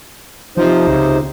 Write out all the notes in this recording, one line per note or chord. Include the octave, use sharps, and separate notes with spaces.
C3 F3 D#4 C5
C#2